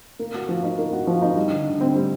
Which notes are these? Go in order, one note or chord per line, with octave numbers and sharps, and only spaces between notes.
A#3
F#4
F3
D#4
A#3
F#4
F3
D#4
G3
D3
D3
C4
G3